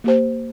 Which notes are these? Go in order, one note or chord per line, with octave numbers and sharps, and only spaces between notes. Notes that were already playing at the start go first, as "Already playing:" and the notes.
A#3 G4 C5